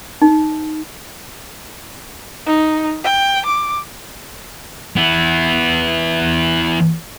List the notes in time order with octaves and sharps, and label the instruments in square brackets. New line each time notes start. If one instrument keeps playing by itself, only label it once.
[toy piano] D#4
[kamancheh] D#4
G5
D6
[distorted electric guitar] E3 B3